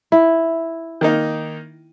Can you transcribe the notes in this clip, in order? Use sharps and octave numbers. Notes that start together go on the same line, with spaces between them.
E4
D#3 A#3 D#4